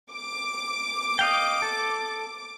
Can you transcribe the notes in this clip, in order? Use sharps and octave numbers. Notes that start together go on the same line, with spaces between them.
D6
D#5 F5 G5
A4